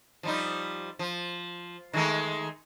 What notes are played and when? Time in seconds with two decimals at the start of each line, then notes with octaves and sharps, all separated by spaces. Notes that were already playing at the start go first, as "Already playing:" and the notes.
0.23 F3 G3 D#4
0.99 F3
1.93 D#3 G#3 A3